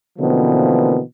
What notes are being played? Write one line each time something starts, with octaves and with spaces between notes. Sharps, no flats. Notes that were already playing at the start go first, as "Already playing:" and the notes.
B2 D3 E3 F3 A#3 C4